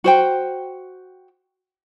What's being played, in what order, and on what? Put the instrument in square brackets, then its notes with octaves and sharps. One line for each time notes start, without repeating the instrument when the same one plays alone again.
[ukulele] F#4 C5 G5